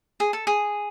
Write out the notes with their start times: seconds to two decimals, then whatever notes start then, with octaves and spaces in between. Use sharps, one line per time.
0.20 G#4
0.33 A4
0.47 G#4